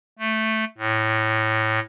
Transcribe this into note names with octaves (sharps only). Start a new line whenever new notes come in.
A3
A2